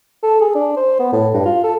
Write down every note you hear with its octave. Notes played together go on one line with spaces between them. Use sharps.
A4
G#4
D4
C5
B3
A2
G2
F4
A4